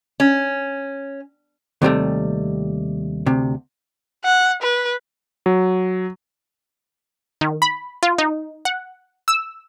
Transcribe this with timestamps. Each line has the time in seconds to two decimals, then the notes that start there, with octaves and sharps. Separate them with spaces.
0.20 C#4
1.82 D#2 C3 G3 A3
3.26 D2 C3
4.25 F#5
4.62 B4
5.46 F#3
7.41 D#3
7.62 B5
8.03 F4
8.18 D#4
8.65 F#5
9.28 E6